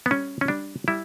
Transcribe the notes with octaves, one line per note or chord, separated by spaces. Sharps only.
B3
G3 C#4
C#4
G3 D4
G3 E4